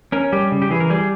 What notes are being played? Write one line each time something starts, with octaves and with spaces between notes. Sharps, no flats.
C#4 A#4
G3 G4
C#3
G4
E3 G#4
A#4
G3 G#4